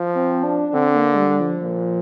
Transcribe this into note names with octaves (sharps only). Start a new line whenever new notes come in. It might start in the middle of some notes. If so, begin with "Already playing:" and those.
Already playing: F3
C4
D4
D4
D3 C4
C4
A#3
G#3
G3
F3
A#2